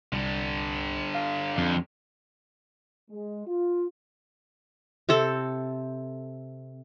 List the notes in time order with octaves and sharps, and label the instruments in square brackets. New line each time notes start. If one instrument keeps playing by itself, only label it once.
[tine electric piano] C2 [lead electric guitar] D3 G3
[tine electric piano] F5
[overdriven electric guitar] F2
[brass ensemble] G#3
F4
[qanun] C3 C4 A4